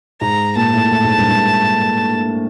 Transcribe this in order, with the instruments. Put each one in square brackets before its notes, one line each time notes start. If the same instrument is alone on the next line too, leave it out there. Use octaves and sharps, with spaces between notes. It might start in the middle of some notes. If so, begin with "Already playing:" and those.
[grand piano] G#2 [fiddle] A#5
[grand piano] A#2 [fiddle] A5
[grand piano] A2
A2
G#2
G2
G#2